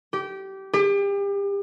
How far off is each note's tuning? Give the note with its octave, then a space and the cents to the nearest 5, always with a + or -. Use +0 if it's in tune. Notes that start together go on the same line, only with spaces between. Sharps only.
G4 -20
G4 +35